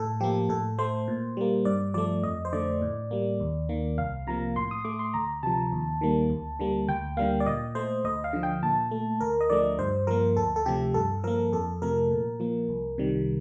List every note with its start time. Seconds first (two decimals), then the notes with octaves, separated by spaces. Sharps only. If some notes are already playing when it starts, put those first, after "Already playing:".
Already playing: A2 A4
0.20 F3 A#3 G4
0.49 A2 A4
0.79 A3 C5
1.08 A#2
1.37 G3 A#3
1.65 G2 D5
1.94 F3 A3 D5
2.23 F2 D#5
2.45 C5
2.53 D3 A3 D5
2.82 A2
3.11 G3 A#3
3.40 D#2
3.69 D#3 A#3
3.98 C2 F5
4.27 C3 F3 A#3 A#5
4.56 A2 C6
4.71 D#6
4.85 A3 D6
4.99 C6
5.14 D2 A#5
5.43 C3 F3 A5
5.72 D#2
6.01 D#3 G3 A#3
6.30 D2
6.60 D3 G3 A#3
6.89 D2 G5
7.17 D3 G3 A#3 F5
7.40 D5
7.46 A#2 D#5
7.75 A3 C5
8.04 D2 D#5
8.24 F5
8.33 D3 F3
8.43 G5
8.63 A#2 A5
8.91 A3
9.21 D2 A#4
9.41 D#5
9.50 D3 F3 A3 D5
9.79 G2 C5
10.07 F3 A#3 A#4
10.37 D2 A4
10.56 A4
10.66 C3 F3 A3 G4
10.94 G2 A4
11.24 F3 A#3 A#4
11.52 F2 A4
11.82 C3 F3 A3 A#4
12.11 A#2
12.40 F3 A#3
12.69 C2
12.98 C3 D#3 G3